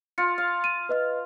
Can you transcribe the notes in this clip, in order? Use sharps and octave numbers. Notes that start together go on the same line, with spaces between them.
F4 C#7
F5
D#7
B4 D#5 F6